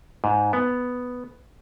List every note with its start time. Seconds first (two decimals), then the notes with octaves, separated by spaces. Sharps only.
0.24 G#2
0.53 B3